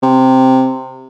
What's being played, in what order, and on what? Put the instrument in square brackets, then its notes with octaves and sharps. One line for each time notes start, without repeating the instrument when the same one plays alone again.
[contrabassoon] C3